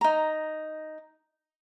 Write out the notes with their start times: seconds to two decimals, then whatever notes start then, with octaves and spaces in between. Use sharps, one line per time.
0.01 D#4 A#5